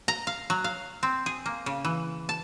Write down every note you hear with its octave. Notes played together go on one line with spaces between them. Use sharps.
A#5
F5
F#3
F5
C4
G#4
A#3
C#3
E3
A5